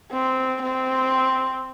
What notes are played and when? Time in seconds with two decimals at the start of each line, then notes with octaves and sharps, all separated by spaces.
0.12 C4
0.62 C4